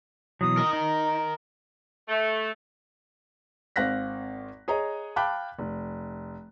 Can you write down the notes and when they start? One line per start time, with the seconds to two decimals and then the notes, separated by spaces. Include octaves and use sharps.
0.41 B2 E3 F#3 D#6
0.57 A#4 D#5
0.73 D#4 A#5
2.08 A3
3.76 G#1 C4 F5 F#6 A#6 B6
4.68 G#4 C#5 D#5 A#5
5.16 F5 G5 A5 B5 D6 F#6
5.59 F1